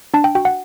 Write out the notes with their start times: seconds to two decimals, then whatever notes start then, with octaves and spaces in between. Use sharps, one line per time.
0.14 D4 A5
0.24 G5
0.35 F#4 G5
0.45 F#5